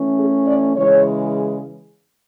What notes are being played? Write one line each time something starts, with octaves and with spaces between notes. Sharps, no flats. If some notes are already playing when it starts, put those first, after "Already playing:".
Already playing: E3 A3 C#4
G#4
D5
C#3 E3 G#3 C#5